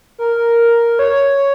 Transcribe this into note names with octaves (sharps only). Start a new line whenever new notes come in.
A#4
C#5